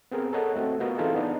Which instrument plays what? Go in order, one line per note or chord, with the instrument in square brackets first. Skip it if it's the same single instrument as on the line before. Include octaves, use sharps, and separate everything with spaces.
[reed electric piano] B3 C4 G#4 A#4
A4 A#4 C#5 D#5 F#5
A3 C4 F#4
B3 F4 F#4 A#4 D#5 F#5
E3 C4 D#4 F4 G#4 A4
B3 D4 D#4